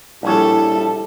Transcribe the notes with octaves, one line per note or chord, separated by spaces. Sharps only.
A#1 G3 E4 A4 C#5 A5